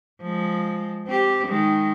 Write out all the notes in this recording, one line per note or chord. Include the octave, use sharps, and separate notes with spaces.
F3 G#3
C4 G4
D#3 G#3